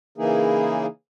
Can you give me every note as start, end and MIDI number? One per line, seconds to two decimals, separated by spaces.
0.18 0.86 49
0.18 0.86 52
0.18 0.86 58
0.18 0.86 63
0.18 0.86 64
0.18 0.86 68